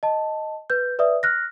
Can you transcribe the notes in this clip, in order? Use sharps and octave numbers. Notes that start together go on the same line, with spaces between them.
D#5 A5
B4 G6
B4 D5 E5 D#6
F6 F#6 A#6